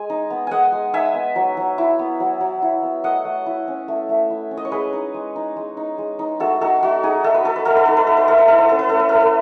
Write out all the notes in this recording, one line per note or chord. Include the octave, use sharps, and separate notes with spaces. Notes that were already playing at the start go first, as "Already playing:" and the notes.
Already playing: G#3 G#5
D#4
B3
G#3 D#5 F#5 G#5
G#3
D#4 E5 G#5
B3
F#3
F#3
E4
B3
F#3
F#3
E4
B3
A3 D#5 F#5
A3
E4
C#4
A3
A3
E4
C#4
D#5
C#5
G#3 G#4 B4
D#4
G#3
D#4
G#3
D#4
G#3
D#4
A3 F#4 A4
D#4 F#4 A4
A3 F#4
D#4 G#4
A3 A4
B4
D#4 A4
B4
A3 A4
B4
D#4 A4
B4
A3 A4
B4
A3 A4
B4
E4 A4
B4
C#4 A4
B4
A3 A4
B4
A3 A4
B4